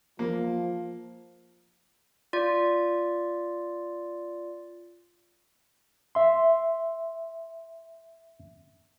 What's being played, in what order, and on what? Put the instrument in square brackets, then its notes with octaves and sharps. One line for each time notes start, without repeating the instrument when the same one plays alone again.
[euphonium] F3 [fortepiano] A#3
[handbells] F4 D5
[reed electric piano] E5 C6